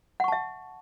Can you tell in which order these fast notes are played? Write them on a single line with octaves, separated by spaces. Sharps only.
F#5 C#6 A5 E5